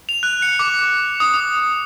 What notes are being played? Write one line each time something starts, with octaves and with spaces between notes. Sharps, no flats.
F7
F#6
C#7
D6
D#6
D#6